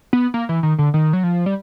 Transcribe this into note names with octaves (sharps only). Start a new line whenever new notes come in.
B3
A#3
E3
D#3
D3
D#3
F#3
F3
G3